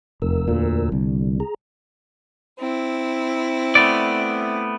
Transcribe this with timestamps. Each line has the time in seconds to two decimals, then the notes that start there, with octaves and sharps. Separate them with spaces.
0.22 F1 E2 A#4 E6
0.48 D2 A#2
0.92 C2 D3 G3
1.40 G#4 A#5
2.59 C4 E4
3.75 A3 B3 D5